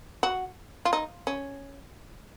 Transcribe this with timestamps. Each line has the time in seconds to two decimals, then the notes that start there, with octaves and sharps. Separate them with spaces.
0.23 F#4
0.85 F4
0.93 D#4
1.27 C#4